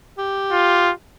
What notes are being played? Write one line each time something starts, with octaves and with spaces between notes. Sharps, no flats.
G4
F4